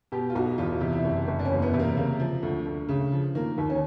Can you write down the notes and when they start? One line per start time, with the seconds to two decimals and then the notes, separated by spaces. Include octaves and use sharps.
0.12 B2 G4
0.30 F4
0.35 B1 F#4
0.58 E2 F4
0.81 C3
0.93 E4
1.04 F#1
1.27 F#1
1.39 D4
1.45 C#4
1.51 E2 A#3
1.62 B3
1.73 C3
1.79 A#3
1.97 C#3 A#3
2.20 F3
2.43 D2
2.66 D2
2.89 C#3
3.12 F3
3.35 D#3 A#3
3.58 D#2
3.70 C#4